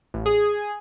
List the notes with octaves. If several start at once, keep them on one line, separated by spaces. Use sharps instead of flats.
A1
G#4